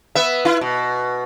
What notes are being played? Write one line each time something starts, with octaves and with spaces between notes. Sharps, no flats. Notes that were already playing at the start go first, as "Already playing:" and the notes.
B3 E5
E4
B2